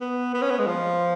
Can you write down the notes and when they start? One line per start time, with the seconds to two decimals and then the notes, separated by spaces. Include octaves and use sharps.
0.01 B3
0.34 B3
0.42 C#4
0.50 B3
0.59 G#3
0.67 F3